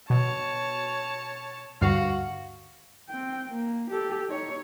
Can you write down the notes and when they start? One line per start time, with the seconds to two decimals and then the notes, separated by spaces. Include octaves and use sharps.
0.10 B2 C#5 A5
1.81 D2 G2 F#4 F5
3.09 C4 G5
3.48 A#3
3.90 G4 A4
4.28 D#4 C#5